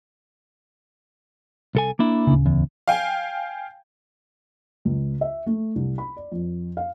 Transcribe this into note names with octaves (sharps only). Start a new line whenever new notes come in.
C2 A4 G#5
A#3 D4 E4
D1 C#3
E2
F5 G5 G#5
C#2
E5
A3
C2
B5
D5
F2
F5